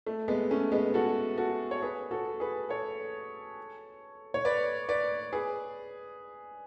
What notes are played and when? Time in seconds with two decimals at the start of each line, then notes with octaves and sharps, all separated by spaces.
0.07 A3
0.28 G#3 B3
0.51 A3 C#4
0.72 G#3 B3
0.94 F#4 A4
1.38 F#4 A4
1.71 C#5
1.82 G#4 B4
2.11 F#4 A4
2.40 G#4 B4
2.69 A4 C#5
4.34 C#5
4.45 B4 D5
4.89 B4 D5
5.33 G#4 B4